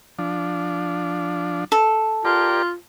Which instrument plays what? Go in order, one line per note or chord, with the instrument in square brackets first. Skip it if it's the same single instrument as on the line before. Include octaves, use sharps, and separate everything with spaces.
[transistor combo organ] F3 D4
[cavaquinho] A4
[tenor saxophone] F4 [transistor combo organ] G4 A#4 D5